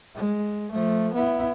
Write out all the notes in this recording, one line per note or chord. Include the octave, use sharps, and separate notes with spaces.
G#3
F3 A3
B3 E4